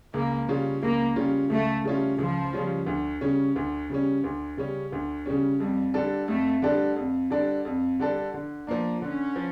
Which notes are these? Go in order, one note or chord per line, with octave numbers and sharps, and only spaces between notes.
C#2 A#3
C#3 G3 C#4 F4
C#2 A#3
C#3 G3 C#4 F4
C#2 A3
C#3 G3 C#4 F4
C#2 F3
C#3 G3 C#4 F4
D2
C#3 G3 C#4
D2
C#3 G3 C#4
D2
C#3 G3 C#4
D2
C#3 G3 C#4
F2 G3
D3 G3 D4 A4
F2 A3
D3 G3 D4 A4
F2
D3 G3 D4 A4
F2
D3 G3 D4 A4
D3
F3 A#3 D4
D3 C#4
F3